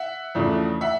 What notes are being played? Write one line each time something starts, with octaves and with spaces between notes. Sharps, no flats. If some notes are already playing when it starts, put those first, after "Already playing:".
Already playing: E5 F#5
E2 C#3 F3 A3 D4
E5 F#5